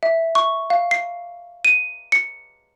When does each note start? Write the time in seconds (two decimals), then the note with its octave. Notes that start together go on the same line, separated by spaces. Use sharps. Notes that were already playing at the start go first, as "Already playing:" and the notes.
0.03 E5
0.35 C#6
0.70 F5
0.91 C7
1.65 D#7
2.12 C#7